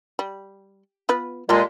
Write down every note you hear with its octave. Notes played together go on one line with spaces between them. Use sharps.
G3
B3 F4 B4
A#2 G3 G#3 F4 A4